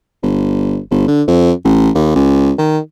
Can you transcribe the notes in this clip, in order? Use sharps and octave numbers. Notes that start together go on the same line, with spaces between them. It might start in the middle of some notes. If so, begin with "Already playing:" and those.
G1
G1
D3
F2
A1
D#2
C#2
D#3